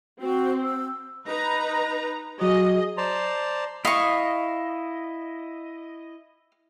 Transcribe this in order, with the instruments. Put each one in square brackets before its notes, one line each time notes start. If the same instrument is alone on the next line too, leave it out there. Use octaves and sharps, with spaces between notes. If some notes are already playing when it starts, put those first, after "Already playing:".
[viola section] C4 [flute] F#4
[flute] E6
[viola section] D#4 B4 A#5
[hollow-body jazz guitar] F#3 [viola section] G#4 D#5
[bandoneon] C5 D5 A5 A#5 C6
[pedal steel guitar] E4 D#5 [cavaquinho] F5 C#6